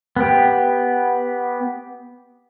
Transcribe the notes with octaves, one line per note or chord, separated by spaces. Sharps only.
B3 G4